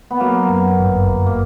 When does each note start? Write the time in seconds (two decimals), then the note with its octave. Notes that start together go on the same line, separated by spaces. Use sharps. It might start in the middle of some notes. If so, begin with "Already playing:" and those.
0.11 B3
0.20 F#3 A#3
0.49 F#2
0.79 G1
1.07 G1
1.26 A#3